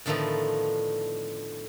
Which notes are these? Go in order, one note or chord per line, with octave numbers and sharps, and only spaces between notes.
A2 D3 D#3 F3 A3 B3